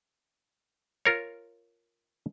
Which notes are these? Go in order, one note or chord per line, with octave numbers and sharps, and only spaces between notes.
F4 A#4 C#5